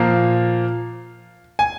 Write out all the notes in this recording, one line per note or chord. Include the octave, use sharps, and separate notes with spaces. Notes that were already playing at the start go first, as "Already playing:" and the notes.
Already playing: A#2 F3 A#3 F5
G#5